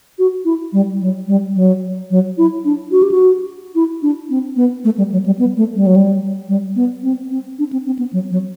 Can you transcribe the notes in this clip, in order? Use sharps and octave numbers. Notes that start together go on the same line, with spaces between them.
F#4
E4
G3
F#3
G3
F#3
F#3
E4
D4
F#4
G4
F#4
E4
D4
C4
B3
A3
G3
F#3
G3
B3
A3
G3
F#3
G3
G3
B3
C4
C4
D4
C4
C4
B3
F#3
F#3